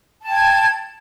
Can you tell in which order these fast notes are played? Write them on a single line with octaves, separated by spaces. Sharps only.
A5 G5 G#6